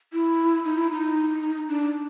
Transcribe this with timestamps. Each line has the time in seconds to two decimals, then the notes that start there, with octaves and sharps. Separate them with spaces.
0.13 E4
0.65 D#4
0.78 E4
0.91 D#4
1.69 D4